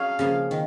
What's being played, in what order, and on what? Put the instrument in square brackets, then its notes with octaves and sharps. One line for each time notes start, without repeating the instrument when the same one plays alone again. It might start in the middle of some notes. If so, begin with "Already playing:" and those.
Already playing: [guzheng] F#3 C#4 G#4 [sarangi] F5
[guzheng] C#3 F3 A#3
D#3